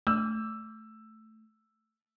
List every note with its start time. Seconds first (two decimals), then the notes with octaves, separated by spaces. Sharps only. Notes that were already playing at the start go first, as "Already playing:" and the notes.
0.07 A3 E6